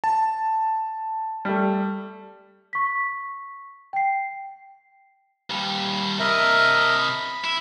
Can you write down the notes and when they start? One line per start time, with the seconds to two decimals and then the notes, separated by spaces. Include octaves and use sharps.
0.04 A5
1.45 G3 A3
2.73 C#6 B6
3.93 G5 C7
5.50 D#2 G3
6.19 C3 A#4 D#5 E5 A#5
6.98 B5
7.44 E4